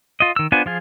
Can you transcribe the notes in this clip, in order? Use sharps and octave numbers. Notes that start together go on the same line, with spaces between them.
F4 D#5
D#3 E6
B3 D4 F4 C5 G#5
F3 F4 G#4